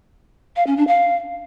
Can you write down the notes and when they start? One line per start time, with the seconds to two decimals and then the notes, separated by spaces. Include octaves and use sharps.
0.56 F5
0.67 C#4
0.77 D4
0.88 F5